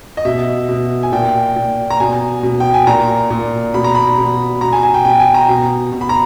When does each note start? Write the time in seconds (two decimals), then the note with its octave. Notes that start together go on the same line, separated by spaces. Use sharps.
0.17 D#5
0.25 B2 E5
0.69 B2
1.03 G#5
1.12 A#2 G5
1.56 A#2
1.90 A#5
2.00 B2 G#5
2.43 B2
2.60 G5
2.74 G#5
2.87 A#2 A#5
3.30 A#2
3.74 B2 B5
3.84 A#5
3.95 B5
4.18 B2
4.61 B2 A#5
4.73 G#5
4.83 G#5
4.94 G5
5.05 B2 G5
5.20 G#5
5.34 A#5
5.48 B2
5.92 B2
6.01 B5
6.09 A#5